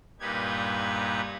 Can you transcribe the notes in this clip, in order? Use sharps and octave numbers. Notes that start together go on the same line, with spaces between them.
G2 A#2 D#4 G4 B4 G#6